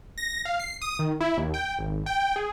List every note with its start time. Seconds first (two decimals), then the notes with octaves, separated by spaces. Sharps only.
0.18 A#6
0.45 F5
0.59 C7
0.82 D#6
0.99 D#3
1.21 E4
1.37 D#2
1.54 G5
1.79 G#1
2.06 G5
2.36 G#4